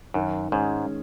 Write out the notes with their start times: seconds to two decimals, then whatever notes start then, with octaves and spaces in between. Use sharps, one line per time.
0.14 F#2 D#3
0.52 G#2 G#3 C#4 G#4